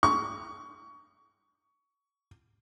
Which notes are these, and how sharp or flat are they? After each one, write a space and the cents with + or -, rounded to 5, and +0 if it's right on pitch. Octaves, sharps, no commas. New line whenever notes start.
C#6 +20